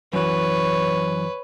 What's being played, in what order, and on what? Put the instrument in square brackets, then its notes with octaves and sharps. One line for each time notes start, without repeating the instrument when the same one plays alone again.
[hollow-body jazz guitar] F#2 E3 [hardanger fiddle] B4 [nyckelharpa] C#5